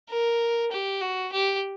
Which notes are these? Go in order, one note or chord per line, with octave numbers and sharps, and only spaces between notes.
A#4
G4
F#4
G4